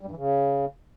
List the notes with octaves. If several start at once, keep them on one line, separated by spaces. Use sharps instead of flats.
G3
G2
E3
C#3